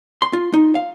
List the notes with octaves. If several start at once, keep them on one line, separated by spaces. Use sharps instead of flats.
C6
F4
D#4
F5